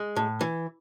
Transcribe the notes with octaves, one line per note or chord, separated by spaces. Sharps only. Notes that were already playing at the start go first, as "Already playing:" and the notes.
Already playing: G#3
A2
E3